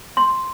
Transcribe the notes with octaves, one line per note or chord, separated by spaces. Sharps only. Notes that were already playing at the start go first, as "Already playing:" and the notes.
C6